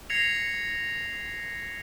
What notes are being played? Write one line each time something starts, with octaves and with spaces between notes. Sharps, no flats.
G#6 A#6 C7 C#7 F7